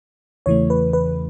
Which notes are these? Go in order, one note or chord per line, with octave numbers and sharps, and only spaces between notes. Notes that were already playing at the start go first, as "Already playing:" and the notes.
E2 C#3 E3 A3 C#5
B4
B4